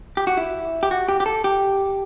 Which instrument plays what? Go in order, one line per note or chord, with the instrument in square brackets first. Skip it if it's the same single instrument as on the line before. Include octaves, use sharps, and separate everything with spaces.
[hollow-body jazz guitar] G4
F#4
E4
G4
F#4
G4
G4
A4
G4